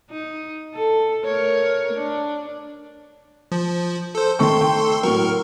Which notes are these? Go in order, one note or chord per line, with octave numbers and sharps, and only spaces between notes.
D#4
A4
A3 A#4 C#5
D4
F3
A4 C5
D#3 A3 A4 C6 C#6
G5
A2 F#3 A#4 C#6